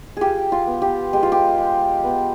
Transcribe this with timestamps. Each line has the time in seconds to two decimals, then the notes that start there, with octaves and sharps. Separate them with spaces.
0.17 F4 G4 G#4
0.52 F4
0.67 B3
0.82 G4
1.13 G#3 G4
1.23 F4
1.32 G4
1.58 G#3
2.04 B3